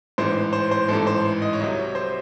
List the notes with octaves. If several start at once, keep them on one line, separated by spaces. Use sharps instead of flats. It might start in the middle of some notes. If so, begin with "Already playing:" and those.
A1 G#2 E3 C5
C5
C5
A1 G#2 E3 A4
C5
D#5
C#5
C2 C3 F#3 D#5
C#5
C5